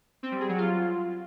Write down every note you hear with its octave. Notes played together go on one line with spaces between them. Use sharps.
C4
G3
G#4
F#3
F4